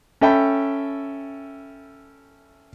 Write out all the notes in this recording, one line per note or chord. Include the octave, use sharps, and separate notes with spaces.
C#4 A4 E5 G5 A5 B5